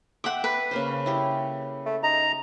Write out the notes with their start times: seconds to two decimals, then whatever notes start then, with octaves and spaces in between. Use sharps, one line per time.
0.24 E5 F#5 G5 D6
0.44 B4
0.71 C#3 A#3 C5
1.06 E4 G4 C#5
1.86 A3
2.03 D#4 A#5